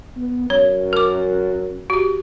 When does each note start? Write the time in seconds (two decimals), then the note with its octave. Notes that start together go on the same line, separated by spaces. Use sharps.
0.17 B3
0.50 F#2 C#5
0.93 A#4 D6
1.90 F#4 G4